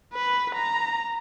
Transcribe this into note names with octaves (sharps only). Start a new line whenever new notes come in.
B4
A#5